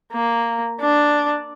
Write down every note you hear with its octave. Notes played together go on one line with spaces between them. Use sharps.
A#3
D4